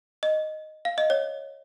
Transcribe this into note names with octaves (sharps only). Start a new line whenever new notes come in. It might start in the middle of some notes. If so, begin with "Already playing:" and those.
D#5
F5
D#5
C#5